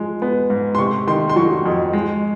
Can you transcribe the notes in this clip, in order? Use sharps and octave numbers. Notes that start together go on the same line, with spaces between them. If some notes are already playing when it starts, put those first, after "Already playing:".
Already playing: F3 G#3
B3
G#2
C6
C3 C#6
D#3 C6
C6
F#3 C#6
F2
G#3